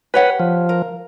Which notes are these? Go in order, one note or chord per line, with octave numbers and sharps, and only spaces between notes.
G4 B4 C#5 F#5
F3
A#4